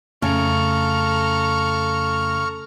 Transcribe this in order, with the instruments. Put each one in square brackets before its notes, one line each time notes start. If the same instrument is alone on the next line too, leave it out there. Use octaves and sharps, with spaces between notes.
[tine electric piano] F2 A3 A5 [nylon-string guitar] C#3 [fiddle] A4 A#5 [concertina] C#6 F6